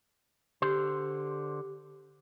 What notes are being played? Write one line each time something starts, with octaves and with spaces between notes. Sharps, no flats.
D3 G4 C5